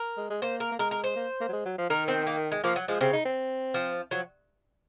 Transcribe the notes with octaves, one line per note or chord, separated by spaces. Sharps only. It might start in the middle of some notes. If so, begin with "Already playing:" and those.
Already playing: A#4
G#3
G#3
A#3 C5
A#4
A#3
G#3 A#4
A#4
C5
A#3
A#3
F#3
G#3
F#3
F3
D#3 A#4
C4
A#3
G#3
F3 A#3
F#3
F3 G#3
C#3 C4
D#4
C4
F3
F3 F#3